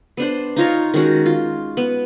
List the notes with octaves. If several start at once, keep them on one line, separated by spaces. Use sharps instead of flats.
B3 D4 C5
D#4 F4 C#5 A#5
D#3 G#3 C#4 F#4
F4
B3